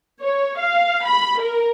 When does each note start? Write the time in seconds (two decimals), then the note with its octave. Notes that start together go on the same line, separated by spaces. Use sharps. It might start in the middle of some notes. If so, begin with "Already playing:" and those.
0.22 C#5
0.58 F5
1.06 B5
1.40 A#4